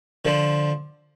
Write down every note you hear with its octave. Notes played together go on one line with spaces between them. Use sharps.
D3 F3